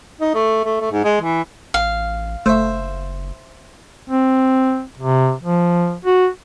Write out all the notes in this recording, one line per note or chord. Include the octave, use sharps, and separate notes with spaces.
D#4
A3
A3
A3
G#2
G#3
E3
A1 F5
F#1 A3 C5 E5
C4
C3
F3
F#4